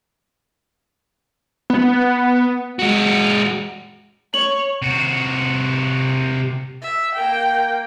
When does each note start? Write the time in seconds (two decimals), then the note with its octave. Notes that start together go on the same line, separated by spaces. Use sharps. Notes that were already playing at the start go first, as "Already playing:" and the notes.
1.70 B3
2.79 G#3 F#4
4.34 C#5 F#7
4.82 C3 F#4
6.82 E5
7.15 A#3 G5